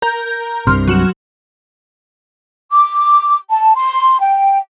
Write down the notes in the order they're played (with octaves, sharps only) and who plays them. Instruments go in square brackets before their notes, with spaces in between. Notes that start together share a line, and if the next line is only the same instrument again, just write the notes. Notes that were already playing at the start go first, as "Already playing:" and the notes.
[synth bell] A#4 A#5 G6
[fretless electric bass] C2 G2 C3 [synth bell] C6 F6
[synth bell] F#3 F#4 E7
[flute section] D6
A5
C6
G5